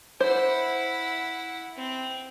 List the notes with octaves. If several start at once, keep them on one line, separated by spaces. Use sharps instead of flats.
E4 C5 F#5
C4